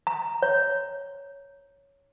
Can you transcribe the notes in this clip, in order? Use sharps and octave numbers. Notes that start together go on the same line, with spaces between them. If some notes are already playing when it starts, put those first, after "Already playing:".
A#5
C#5